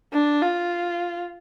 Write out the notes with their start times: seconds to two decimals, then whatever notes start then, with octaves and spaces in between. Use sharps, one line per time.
0.12 D4
0.41 F4